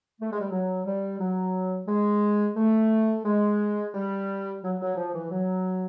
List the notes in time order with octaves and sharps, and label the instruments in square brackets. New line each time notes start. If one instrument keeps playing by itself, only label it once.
[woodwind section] A3
G#3
G3
F#3
G3
F#3
G#3
A3
G#3
G3
F#3
F#3
F3
E3
F#3